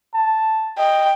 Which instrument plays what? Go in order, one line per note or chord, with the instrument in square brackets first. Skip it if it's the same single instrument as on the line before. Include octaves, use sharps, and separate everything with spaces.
[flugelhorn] A5
[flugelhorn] D#5 [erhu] G5